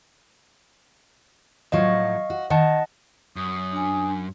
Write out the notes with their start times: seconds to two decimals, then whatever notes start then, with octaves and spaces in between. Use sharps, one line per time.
1.72 A2 F3 F#3 D#5 F5 C#6
2.30 F#4
2.50 D#3 D#5 F#5 A5
3.36 F#2 D#6
3.72 D4 G#5